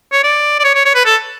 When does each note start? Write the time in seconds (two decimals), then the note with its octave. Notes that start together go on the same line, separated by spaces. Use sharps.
0.12 C#5
0.24 D5
0.60 D5
0.65 C#5
0.75 C#5
0.85 C#5
0.95 B4
1.05 A4